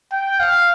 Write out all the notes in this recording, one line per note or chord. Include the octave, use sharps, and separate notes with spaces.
G5
F5